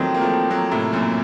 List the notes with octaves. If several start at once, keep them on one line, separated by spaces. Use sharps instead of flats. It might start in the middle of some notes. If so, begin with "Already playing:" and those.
Already playing: D#3 F3 F#3 A3 C4
A#3
F3 A3
F#3 A#3
A2 C3
F#2 A#2